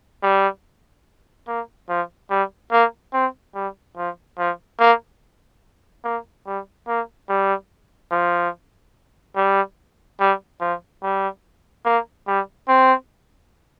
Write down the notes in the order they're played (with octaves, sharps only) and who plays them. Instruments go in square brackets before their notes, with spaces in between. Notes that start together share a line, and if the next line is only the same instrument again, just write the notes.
[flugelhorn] G3
A#3
F3
G3
A#3
C4
G3
F3
F3
A#3
A#3
G3
A#3
G3
F3
G3
G3
F3
G3
A#3
G3
C4